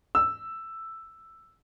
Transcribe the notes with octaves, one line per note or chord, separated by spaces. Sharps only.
E6